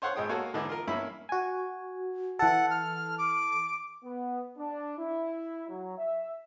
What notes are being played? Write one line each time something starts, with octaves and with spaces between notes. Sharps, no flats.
C5 C#5 F5 F#5 C6 C#6
G#1 G#3 G5 D#6
A#3 F#4 A4 C#5 F5 G#5
G#2 D3 E3 D4 D#4
F4 A#4
G2 A#3 C#4 E4 E5 B5
F#4 G#5
E3 A4 F#5
F6
D6
B3
D4
E4
F#3
E5